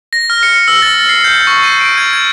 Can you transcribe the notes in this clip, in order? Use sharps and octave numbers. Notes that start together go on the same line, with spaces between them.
A#6
F6
C#7
E6
A6
C7
G6
C#6
D#7
D7
G#6
G#6